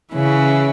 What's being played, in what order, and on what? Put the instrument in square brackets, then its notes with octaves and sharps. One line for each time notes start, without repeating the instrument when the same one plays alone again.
[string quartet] C#3 E3 C#4 E4